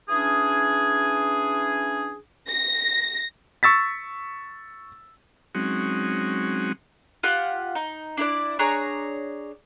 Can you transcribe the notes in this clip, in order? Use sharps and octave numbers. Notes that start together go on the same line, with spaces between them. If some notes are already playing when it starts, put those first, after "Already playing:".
E3 C#4 D4 G#4
A#6
C#6 E6 A6 B6
F#3 G#3 C4 C#4 D#4 F#4
F4 G4 F#5
D#4
D4 E4 A#4 D5
D4 G#4 C#5 A#5